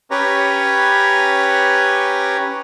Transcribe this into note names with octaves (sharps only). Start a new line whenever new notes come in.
C#4 G4 B4 C#5 A#5